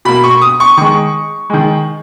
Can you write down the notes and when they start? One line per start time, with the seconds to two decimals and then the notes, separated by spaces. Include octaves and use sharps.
0.05 B2 A#3 B5
0.24 C#6
0.42 D#6
0.60 C#6
0.77 D#3 G#3 C#6
1.50 D#3 G#3